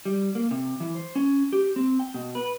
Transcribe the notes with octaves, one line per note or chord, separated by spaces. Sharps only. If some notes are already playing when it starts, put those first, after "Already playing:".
G3
A#3
C3
E3
C5
C#4
G4
C4
G5
B2
B4